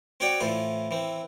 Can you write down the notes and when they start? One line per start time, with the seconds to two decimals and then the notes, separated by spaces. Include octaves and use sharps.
0.20 C4 F#4 C#5 D5 G5
0.40 A2 E3 F4 C5
0.91 E3 C4